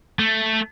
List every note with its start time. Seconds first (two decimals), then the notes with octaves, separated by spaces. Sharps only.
0.19 A3